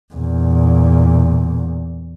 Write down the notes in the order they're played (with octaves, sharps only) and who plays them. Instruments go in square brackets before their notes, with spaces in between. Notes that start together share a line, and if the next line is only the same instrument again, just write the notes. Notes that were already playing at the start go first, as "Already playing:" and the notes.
[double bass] E2 A#2